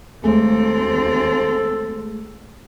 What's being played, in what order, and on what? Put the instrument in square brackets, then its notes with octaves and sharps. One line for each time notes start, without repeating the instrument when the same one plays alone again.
[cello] D#2 C4 [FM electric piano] G#3 A3 G#4 [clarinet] A4